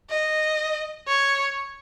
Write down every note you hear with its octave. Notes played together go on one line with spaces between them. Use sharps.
D#5
C#5